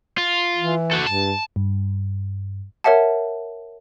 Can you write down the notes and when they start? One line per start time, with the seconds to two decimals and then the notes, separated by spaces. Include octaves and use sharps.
0.18 F4
0.57 E3
0.91 F#4 A4
1.06 G2 A5
1.56 G2
2.84 A#4 C#5 E5 F#5 A5